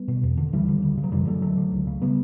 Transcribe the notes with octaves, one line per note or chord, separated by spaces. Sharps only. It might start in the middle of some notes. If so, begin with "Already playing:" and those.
Already playing: G3 B3
B2
E2
D3
D2 E3 G3
D3
D2
C#3
F#3
F#2 E3 G3
D3 F#3 A3
D2 F#3 A3
D3
C#2
C#3
G3 B3